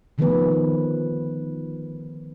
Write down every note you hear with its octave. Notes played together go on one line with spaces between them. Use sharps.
D3 D#3 F3 A3 B3 B4